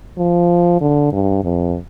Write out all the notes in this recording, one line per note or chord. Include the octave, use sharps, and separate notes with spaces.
F3
D3
G2
F2